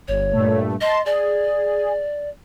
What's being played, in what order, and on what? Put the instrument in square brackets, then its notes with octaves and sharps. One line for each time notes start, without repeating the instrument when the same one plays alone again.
[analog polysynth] G1 [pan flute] C#5
[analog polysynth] G2 A#2 A3
[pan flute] D#5 [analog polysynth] A5 C6
[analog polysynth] G#4 [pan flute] D5